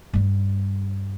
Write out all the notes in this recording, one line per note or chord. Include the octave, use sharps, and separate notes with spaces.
G2 G3